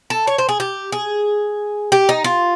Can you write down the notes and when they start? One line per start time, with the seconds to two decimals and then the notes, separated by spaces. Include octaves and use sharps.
0.10 A4
0.27 C#5
0.38 C5
0.49 G#4
0.60 G4
0.92 G#4
1.92 G4
2.09 D#4
2.24 F4